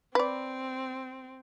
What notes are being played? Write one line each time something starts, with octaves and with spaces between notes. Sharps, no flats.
C4 B4 D5